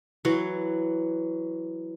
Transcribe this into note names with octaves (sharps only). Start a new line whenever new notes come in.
E3 F#3 C#5